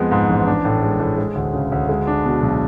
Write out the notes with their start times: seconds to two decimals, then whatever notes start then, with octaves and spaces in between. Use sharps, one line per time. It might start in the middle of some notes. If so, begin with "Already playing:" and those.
Already playing: F2 G#3 B3
0.11 G#2
0.29 A1
0.46 D4
0.65 A2
0.83 G#3
1.00 A2
1.18 G#3
1.35 D2
1.54 C#3
1.72 D2
1.89 G#3
2.07 D4
2.25 B2
2.43 B1